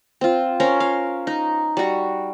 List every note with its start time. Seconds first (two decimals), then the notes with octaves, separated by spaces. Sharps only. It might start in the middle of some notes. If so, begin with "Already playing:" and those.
0.21 C4 F4
0.60 C#4 A#4 C5
0.80 F5
1.27 D#4
1.77 G3 F#4